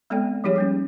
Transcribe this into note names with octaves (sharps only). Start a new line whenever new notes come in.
G#3 B3 C4 A4 D5 G5
F3 G3 D#4 G4 G#4 C#5
G3 A#3 C#4